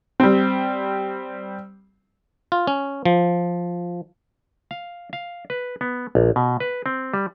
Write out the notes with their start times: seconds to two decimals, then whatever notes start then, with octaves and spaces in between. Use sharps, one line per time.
0.20 G3 C4
2.52 F4
2.67 C#4
3.05 F3
4.71 F5
5.13 F5
5.50 B4
5.81 B3
6.15 A#1
6.36 B2
6.60 B4
6.86 C4
7.14 G3